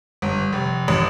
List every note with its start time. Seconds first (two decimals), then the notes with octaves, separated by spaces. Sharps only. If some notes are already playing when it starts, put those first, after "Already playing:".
0.22 G1
0.53 F1
0.88 A1